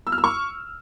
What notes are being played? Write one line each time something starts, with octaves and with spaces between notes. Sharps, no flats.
E6
F6
E6
C#6